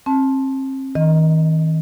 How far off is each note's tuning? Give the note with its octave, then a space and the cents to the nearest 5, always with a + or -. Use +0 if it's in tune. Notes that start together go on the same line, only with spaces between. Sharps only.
C4 +40 A5 -15
D#3 +40 D#5 +0